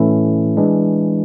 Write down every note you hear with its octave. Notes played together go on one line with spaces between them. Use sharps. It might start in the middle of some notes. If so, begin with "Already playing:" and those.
Already playing: A2 E3 A3 C#4 E4
E3 G#3 D4